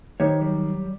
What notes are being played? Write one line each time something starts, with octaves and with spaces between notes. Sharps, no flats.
D#3 G4 C5 C#5
F#3 G3